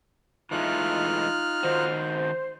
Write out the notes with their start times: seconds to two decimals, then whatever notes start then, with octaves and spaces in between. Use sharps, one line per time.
0.51 E3 G#3 A3 D#4 F4 F6 F#6
1.63 D#3 F#4 C5